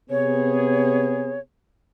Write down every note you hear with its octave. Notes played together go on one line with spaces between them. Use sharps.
C3 B3 G#4 C#5